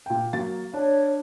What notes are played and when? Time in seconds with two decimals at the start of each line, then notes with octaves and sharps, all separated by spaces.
0.06 A#2 G5
0.33 F#3 A#3 A6
0.74 D4 C#5